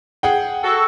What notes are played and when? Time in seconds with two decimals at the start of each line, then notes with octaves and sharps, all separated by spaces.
0.23 G#4 F#5 G5
0.63 F#4 A4